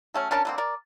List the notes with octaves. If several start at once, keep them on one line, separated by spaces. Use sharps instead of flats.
F#3 A3 C#4
C#4 D4 A#4 A5
D3 A#3 C4
A#4 D5